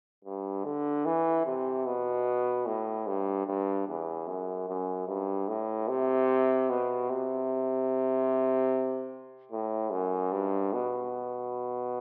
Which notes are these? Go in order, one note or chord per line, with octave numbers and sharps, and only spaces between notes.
G2
D3
E3
C3
B2
A2
G2
G2
E2
F#2
F#2
G2
A2
C3
B2
C3
A2
F#2
G2
B2